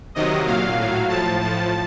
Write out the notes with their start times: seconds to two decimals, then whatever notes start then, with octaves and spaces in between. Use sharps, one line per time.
0.15 C3 D#3 F#3 D#5
0.46 A#2 F#3 F5
0.78 A2 F#3
1.09 A2 F3 A5
1.40 A2 F3 A5